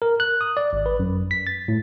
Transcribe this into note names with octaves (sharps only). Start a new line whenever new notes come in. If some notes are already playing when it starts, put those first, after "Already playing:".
A#4
F#6
D#6
D5
G#1
B4
F#2
B6
A6
A2